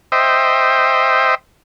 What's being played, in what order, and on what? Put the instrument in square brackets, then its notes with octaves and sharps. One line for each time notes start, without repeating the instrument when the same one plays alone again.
[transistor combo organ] C5 D#5 E5 G5